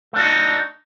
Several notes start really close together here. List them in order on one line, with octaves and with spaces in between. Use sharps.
A3 D4 F#4 D#4